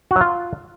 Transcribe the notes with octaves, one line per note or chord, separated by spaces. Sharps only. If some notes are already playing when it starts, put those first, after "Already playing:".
F#4
F#3
F4